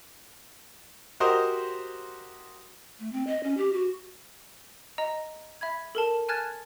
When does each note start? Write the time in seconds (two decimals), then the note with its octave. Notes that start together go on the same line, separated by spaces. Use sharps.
1.20 F#4 G4 A#4 C5 D#5
2.99 A3
3.12 C4
3.27 D#5
3.43 C#4
3.57 G4
3.73 F#4
4.98 D#5 A#5
5.61 E5 B5 G#6
5.95 A4 A#4 A5
6.29 G#5 A5 F6 F#6 G#6 A6